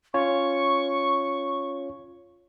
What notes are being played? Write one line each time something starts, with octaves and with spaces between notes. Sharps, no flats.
C#4 F4 C#5 C#6